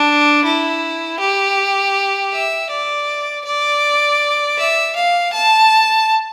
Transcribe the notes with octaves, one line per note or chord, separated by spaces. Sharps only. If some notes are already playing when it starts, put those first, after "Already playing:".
Already playing: D4
E4
G4
E5
D5
D5
E5
F5
A5